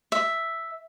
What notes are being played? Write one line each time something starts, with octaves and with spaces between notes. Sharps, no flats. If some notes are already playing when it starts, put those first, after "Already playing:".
E5